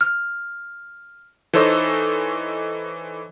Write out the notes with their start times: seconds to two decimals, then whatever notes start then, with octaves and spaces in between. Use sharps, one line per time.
0.01 F6
1.53 E3 D#4 A4 C5 C#5 D#5